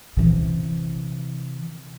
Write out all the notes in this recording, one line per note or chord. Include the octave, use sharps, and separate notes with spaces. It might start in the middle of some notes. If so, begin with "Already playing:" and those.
C3 E3